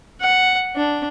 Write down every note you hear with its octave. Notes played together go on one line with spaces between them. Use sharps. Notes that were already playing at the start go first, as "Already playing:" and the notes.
F#5
D4